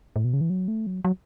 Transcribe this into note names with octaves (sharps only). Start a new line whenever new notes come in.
A2
B2
C#3
E3
F#3
A3
F#3
F#3